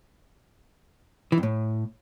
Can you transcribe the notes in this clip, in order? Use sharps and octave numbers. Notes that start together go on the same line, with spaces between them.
E3
F2
A2